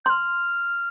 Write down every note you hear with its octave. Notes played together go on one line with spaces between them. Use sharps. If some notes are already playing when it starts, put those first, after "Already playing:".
C6 F6 G6